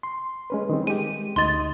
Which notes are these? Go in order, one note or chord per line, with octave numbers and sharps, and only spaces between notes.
C6
G#3 C#4 B4
D#3 G3 C4
G#3 G4 D#7
D2 D#4 D#5 C6 A6